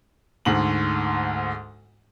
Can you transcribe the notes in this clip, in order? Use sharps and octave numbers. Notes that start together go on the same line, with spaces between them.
D2 G#2 F#7